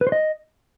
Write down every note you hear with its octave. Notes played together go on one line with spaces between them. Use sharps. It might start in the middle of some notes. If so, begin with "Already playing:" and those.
B4
C5
D#5